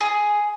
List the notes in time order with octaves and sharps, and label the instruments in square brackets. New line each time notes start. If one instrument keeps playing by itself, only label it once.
[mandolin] G#4